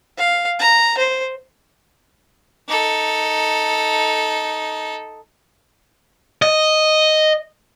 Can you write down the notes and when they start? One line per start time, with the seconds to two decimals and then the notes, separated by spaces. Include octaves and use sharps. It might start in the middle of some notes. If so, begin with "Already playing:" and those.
0.18 F5
0.59 A#5
0.98 C5
2.68 D#4 A4
6.42 D#5